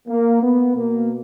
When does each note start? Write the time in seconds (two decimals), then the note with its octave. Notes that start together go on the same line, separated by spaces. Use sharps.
0.08 A#3
0.42 B3
0.76 B2 A#3